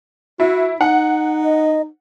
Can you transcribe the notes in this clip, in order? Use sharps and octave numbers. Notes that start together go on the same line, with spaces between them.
E4 F#4
D#4 F#5
D#5